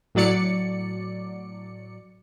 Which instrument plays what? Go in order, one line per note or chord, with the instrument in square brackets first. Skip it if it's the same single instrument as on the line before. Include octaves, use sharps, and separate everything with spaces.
[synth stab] A2 F#3 D5 C#7